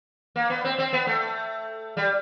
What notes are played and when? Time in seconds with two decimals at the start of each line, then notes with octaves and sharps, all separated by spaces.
0.36 A#3
0.50 B3
0.64 C4
0.79 C4
0.93 B3
1.07 A3
1.97 G3